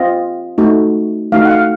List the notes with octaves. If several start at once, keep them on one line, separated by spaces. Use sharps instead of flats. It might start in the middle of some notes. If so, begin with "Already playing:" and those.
Already playing: C4 F4 D#5
A3 D#4 F#4
A3 D#4 F#4 F5
F#5
F5